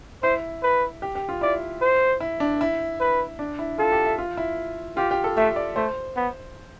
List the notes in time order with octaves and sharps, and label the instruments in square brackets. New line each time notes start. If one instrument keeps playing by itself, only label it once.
[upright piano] E4 [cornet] C5
[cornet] B4
[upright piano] G4
G4
F4
[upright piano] E4 [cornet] D5
[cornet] C5
[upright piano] E4
D4
E4
[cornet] B4
[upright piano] D4
E4
[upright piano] F4 [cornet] A4
[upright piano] G4
E5
F4
E4
[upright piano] F4 [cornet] G4
[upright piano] G4
A4
[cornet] A3 [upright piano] E5
[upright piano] D5
[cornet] A3 [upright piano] C5
[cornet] B3